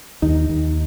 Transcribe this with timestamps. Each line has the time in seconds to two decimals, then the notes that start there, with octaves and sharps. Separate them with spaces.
0.22 D#2 D#4
0.49 D#2